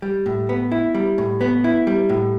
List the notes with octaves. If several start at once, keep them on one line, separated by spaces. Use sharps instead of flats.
G3
A2
B3
E4
G3
A2
B3
E4
G3
A2